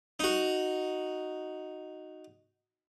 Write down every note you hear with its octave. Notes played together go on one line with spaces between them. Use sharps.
D#4 F#4